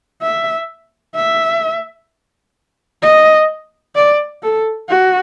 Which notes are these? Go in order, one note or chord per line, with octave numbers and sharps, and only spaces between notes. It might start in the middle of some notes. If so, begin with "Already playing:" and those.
E5
E5
D#5
D5
A4
F#4